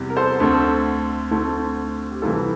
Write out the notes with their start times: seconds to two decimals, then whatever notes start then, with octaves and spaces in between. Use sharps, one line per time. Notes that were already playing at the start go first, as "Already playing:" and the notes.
Already playing: E2 C3 G3 C4
0.10 A#4
0.17 A4 C5
0.40 D2 D3 A3 C4
1.31 D2 D3 A3 C4
2.11 G4
2.22 C2 C3 E3 A3 F4 A4